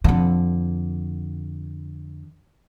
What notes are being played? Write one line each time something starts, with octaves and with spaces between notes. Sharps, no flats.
F2 D3